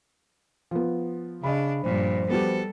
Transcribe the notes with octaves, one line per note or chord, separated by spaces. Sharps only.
F3 B3
C#3 D4 D#5 B5
G2 A#2 F3
G3 B3 F#4 G4 A4